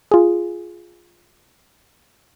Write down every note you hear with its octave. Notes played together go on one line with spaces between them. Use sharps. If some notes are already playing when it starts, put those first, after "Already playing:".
F4 G#4